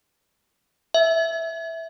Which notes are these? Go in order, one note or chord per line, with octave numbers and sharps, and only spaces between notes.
E5